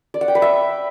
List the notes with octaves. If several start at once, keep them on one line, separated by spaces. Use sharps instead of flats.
D5
F#5
G5
B4
E5